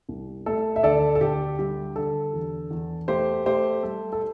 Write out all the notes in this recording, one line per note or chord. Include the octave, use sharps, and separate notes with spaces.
C2
A3 A4
E5
D2 A4 D5
A4
D2 G4
G3 G4
D3 A4
E2
E2
A3 G4 C5
A3 G4 C5
G3 A4
A4